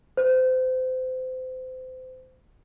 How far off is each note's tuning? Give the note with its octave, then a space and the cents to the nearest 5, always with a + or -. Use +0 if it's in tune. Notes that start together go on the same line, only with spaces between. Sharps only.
C5 -30